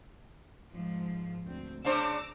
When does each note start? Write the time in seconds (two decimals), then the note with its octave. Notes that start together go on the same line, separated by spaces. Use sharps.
0.70 G#2 F3
1.44 D2 C4
1.85 C#3 D4 C5 A#5 D6 E6